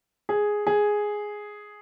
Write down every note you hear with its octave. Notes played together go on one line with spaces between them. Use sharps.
G#4
G#4